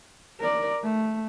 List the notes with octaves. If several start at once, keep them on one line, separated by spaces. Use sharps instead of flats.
A#4 D5
A3